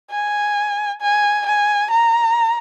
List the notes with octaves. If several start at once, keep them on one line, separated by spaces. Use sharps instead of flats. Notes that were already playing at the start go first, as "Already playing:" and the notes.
G#5
G#5
G#5
A#5